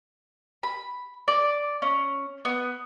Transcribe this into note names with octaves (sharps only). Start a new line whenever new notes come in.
B5
D5
C#4
B3